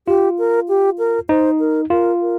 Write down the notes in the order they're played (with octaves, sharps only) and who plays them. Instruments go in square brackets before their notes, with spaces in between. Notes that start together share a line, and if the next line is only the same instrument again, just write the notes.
[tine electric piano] F4 [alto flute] G4
[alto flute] A#4
G4
A#4
[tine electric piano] D#4 [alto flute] C5
[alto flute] A#4
[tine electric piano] F4 [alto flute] A#4
[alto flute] A#4